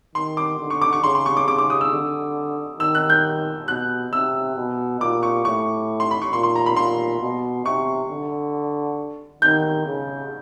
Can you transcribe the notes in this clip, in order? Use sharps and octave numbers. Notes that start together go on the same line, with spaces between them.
D#3 C6
D6
D3
C#6
D6
C#6
C#3 C6
C6
C#6
D6
C#3 D6
D6
D#6
E6
D3
D#3 E6
F#6
G6
B2 F#6
C3 E6
B2
A#2 D6
C#6
A2 C#6
C6
B5
C#6
A#2 C6
C6
A#5
B5
A#2 C6
B2
C3 C#6
D3
D#3 G6
C#3